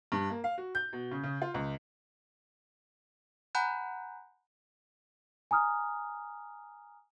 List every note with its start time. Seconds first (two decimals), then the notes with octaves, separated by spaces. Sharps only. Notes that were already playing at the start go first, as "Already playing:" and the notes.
0.12 G2
0.30 A#3
0.44 F5
0.58 F#4
0.75 G6
0.93 B2
1.11 C#3
1.23 C#3
1.42 F4
1.54 C#2
3.55 F#5 G#5 A#5 B5 F#6 G6
5.51 G#5 A#5 D#6 F6